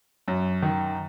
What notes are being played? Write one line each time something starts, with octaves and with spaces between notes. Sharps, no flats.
F#2
D#3